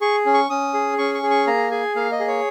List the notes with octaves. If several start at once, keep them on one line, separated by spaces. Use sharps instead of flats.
G#4 C#6
C#4
C#6
C#4 D#6
G#4
C#4 C#6
C#6
G#4
C#6
A#3 A#5
G#4 G#5
A#3 F5
D#5
G#4
C#5